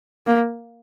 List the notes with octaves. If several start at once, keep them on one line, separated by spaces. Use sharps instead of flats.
A#3